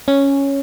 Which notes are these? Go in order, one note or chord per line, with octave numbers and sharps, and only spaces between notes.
C#4